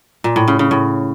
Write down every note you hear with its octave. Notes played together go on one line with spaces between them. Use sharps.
A#2
A2
C#3
C#3
A2